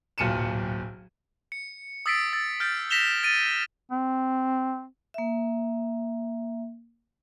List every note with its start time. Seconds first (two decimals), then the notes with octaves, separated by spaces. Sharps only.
0.18 D1 B1 A#2 C#7 D#7 E7
1.52 C#7
2.06 D#6 E6 A6 B6 C7 D7
2.33 D#6 E6 A6
2.60 F6 G6 A6 D7
2.90 A#6 B6 C#7 E7 F7 G7
3.23 A6 D7 D#7
3.91 C4
5.14 A#3 E5